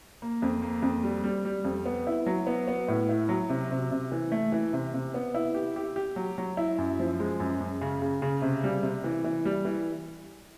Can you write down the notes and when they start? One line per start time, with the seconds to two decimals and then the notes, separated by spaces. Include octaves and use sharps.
0.22 A#3
0.42 F2
0.62 A#3
0.82 F2
1.03 G3
1.24 G3
1.45 G3
1.65 F2
1.86 B3
2.07 E4
2.26 F#3
2.47 B3
2.68 B3
2.88 A2
3.09 E4
3.29 F#3
3.49 C3
3.71 C3
3.91 C3
4.12 E3
4.32 A3
4.52 E3
4.73 C3
4.94 C3
5.14 B3
5.34 E4
5.55 G4
5.76 G4
5.96 G4
6.16 F#3
6.38 F#3
6.57 E4
6.78 F#2
6.99 F3
7.20 G#3
7.40 F#2
7.60 F#2
7.81 C#3
8.02 C#3
8.22 C#3
8.42 C3
8.64 G3
8.83 C3
9.04 E3
9.24 E3
9.45 G3
9.65 E3